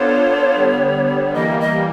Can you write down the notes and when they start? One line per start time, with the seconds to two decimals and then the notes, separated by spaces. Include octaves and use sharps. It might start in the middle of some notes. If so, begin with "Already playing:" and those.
Already playing: B3 D4 F4 A4 C5 C#5
0.55 D3 G3 B3
1.34 E3 G3 A#3 D#5
1.60 D#5